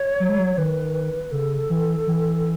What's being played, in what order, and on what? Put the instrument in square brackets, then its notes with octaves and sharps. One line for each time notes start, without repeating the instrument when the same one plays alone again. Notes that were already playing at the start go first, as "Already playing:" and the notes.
Already playing: [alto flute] C#5
[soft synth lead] F#3
G#3
F#3
[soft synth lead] D#3 [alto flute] B4
[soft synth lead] C#3 [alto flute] A4
[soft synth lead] E3
E3